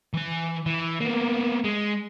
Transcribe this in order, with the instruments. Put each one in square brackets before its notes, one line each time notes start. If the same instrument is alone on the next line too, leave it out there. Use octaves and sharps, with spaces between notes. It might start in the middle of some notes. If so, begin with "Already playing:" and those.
[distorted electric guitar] E3 G#5
E3
A#3 B3
G#3